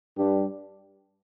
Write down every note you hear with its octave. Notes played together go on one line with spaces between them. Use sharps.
G2 G3 D4 G4